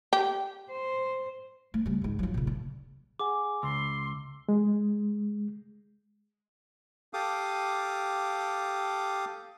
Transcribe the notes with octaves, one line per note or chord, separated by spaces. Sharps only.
G4
C5
A3
C#3 G3
C#2 G#2
F3 F#3
A#2 C#3
D4
G#4 F#5 G#5 D6
C#2 C6 E6
G#3
G4 A4 F5 D6 D#6